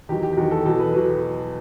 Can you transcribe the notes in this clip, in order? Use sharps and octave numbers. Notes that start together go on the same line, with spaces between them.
E2 D#3 F#3 G4
G4
G4
E2 D#3 F#3 F#4
A4
E2 B2 F#3 A4
B4
B2 F#3 B4